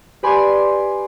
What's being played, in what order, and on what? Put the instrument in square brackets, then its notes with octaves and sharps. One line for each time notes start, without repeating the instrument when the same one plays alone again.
[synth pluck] G4 B4 D5 G#5 B5 C6